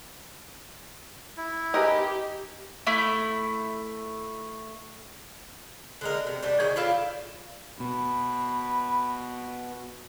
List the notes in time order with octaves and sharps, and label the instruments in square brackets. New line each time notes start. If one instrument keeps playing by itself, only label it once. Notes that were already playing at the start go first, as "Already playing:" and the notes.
[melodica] E4
[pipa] D#4 A#4 B4 [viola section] G4 [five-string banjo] D#5 G#5
[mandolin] A3 E4
[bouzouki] D3 G#3 A#4
C3
A2 G3 A3 D4
D#3 C#4 G#4 G#5
E4 F4 A4 D5
[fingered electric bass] B2 [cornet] B5